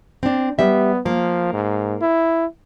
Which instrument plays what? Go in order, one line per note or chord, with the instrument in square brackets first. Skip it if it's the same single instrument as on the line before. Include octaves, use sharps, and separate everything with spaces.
[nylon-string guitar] C4 D4
[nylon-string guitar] G3 E5 [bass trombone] B3
[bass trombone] F3 [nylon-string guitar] A#3
[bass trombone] G#2
E4